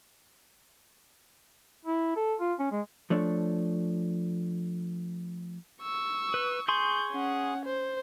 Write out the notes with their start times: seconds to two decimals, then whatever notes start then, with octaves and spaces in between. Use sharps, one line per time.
1.85 E4
2.16 A4
2.40 F4
2.59 C#4
2.72 G#3
3.10 F3 A3 D4 C#5
5.83 C#6 E6
6.34 B4
6.68 G#4 C6 C#6 G6
7.12 C#4 F#5
7.65 C5